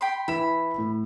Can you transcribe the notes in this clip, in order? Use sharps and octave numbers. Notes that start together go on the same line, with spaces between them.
G5 B5 C6
E3 E4 B5 E7
A2